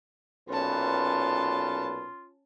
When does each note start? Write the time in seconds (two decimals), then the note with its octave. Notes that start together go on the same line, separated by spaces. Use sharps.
0.49 B1 A#2 C#4 F4 B4 A5